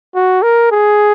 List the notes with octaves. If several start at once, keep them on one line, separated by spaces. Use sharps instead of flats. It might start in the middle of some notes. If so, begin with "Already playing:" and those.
F#4
A#4
G#4